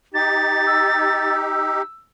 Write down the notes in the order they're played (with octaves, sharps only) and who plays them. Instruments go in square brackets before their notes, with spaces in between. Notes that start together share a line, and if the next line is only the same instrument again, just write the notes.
[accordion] D#4 G4 [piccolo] A6
[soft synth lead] E6